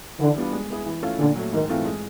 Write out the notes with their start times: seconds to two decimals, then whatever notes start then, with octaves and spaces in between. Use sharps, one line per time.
0.20 D3 E3
0.36 G3 B3 D4 F4
0.53 G#3
0.70 B3 E4 G#4
0.86 E3
1.03 A3 C#4 F4 A4
1.19 A#2 D3
1.36 F#3 A3
1.53 G#2 D#3
1.69 E3 A3 C4 F4
1.85 G#3